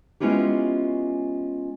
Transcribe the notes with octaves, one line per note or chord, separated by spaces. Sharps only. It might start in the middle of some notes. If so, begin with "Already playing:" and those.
G#3 B3 C#4 E4 F4 G4